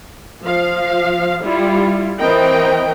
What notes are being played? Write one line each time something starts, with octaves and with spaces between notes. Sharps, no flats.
F3 F5
G3 E4 F4
E3 C4 A#4 B4 D#5 G5